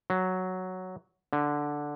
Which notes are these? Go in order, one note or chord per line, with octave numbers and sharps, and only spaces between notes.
F#3
D3